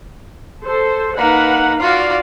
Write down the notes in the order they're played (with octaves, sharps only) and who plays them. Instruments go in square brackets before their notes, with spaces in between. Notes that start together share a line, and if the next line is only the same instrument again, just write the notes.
[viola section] A4 C5
[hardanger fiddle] A#3 D#4 [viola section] B4 F#5
[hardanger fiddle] F4 F#4 [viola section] D5 F5